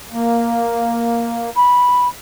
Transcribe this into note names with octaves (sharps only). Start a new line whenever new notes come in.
A#3
B5